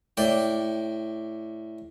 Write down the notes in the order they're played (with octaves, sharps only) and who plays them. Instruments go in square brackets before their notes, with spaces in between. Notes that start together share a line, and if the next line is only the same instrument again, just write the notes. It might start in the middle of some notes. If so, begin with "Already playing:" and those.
[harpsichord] A2 D5 G5